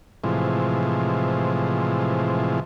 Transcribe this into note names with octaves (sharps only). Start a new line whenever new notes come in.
A2 C3 E3 F3 G#3